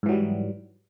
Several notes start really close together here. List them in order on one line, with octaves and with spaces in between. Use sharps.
G#2 E3 F#3 G3